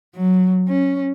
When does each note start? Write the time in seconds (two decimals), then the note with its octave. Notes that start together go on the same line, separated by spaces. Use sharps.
0.15 F#3
0.69 C#4